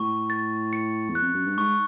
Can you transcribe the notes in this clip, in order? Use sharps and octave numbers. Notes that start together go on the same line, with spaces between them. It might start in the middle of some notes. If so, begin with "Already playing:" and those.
Already playing: A2 C#6
A6
C#7
E2
F#6
F2
F#2
G2
G#2 C#6